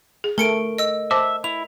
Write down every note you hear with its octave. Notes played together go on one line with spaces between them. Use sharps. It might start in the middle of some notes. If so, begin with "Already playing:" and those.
G#4
A3 A#4 C#7 D7
D#5 E6
C5 E5 A5 D6
E4 F7